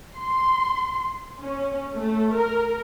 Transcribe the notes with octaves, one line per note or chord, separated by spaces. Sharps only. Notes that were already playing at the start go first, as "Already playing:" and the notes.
C6
C#4
A3
A#4